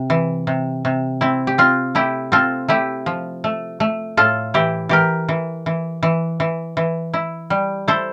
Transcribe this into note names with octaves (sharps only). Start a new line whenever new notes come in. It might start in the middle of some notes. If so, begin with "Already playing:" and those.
Already playing: C3
E3
C3
C3
C4 E4
G4
C4 F4
A3 E4 G4
C4 F4 A4
A3 E4 G4
F3
A3
A3
A2 F4 A4
E3 E4 G4
E3 G4 A#4
E3
E3
E3
E3
E3
E4
G3
E4 A4 C5